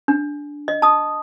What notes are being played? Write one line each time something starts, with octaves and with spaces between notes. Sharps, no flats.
D4
D#5
A5 D#6